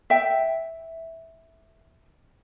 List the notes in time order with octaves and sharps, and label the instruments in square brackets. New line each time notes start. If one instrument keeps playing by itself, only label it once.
[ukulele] E5 G5